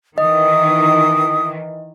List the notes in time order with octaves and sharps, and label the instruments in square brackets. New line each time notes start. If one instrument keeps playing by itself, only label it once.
[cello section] D#3 E3 [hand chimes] D#5 [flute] D#6